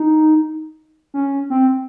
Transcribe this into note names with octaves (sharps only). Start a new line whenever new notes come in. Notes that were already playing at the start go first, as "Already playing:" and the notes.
Already playing: D#4
C#4
C4